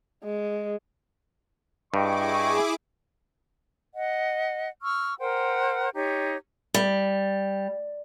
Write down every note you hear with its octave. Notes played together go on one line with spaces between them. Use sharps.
G#3
G2 E4 G#4 D#5 G5 C#6 D6
D#5 F#5
C#6 E6 F6
A#4 C5 F#5 G5
D#4 G4 C#5
G3